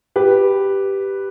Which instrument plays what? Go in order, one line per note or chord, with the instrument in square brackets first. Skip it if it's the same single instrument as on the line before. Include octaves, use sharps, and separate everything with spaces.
[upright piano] G4 B4